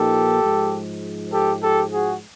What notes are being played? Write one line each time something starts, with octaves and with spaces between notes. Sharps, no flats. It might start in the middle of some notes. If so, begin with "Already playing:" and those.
Already playing: A#2 F3 A#3 D#4 G4 A4
G#2 F3 G#3
G4 A4
G4 A4
F#4 G#4